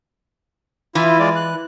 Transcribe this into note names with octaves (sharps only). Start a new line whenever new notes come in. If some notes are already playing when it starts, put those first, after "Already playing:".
E3 E4 F4
G#3 F4 D5
F#6